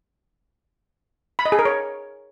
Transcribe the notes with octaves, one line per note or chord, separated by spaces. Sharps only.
B5
D#5
G#4
A#4
C#5